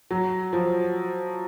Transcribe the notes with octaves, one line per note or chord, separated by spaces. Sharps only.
F#3
F3